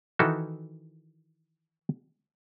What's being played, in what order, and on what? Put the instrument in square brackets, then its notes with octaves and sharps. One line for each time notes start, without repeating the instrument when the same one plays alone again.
[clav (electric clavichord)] D#3 E3 D#4 E4 F#4 A4